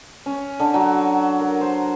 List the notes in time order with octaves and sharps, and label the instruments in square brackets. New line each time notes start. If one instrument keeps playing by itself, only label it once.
[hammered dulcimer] C#4
D3
F#3
A#4
C5